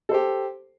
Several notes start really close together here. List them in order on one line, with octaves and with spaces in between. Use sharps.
A4 C5 G4